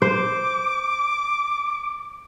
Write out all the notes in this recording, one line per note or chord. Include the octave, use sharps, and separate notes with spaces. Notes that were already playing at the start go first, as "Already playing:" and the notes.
C5 D6